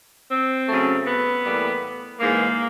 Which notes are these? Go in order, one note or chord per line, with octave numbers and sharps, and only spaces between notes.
C4
C#3 F#3 A3
B3
A2 E3 G3 A#3
G#2 E3 G#3 A#3